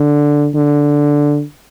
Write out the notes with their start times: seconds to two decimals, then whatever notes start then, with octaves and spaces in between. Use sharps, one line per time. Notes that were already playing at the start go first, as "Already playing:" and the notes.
Already playing: D3
0.55 D3